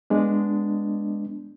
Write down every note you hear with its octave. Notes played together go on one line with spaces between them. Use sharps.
G#3 B3 D4